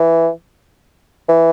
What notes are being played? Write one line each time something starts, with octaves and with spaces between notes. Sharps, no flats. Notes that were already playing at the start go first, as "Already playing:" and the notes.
Already playing: E3
E3